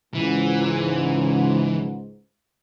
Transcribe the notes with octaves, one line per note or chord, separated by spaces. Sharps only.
C#2 G#2 E3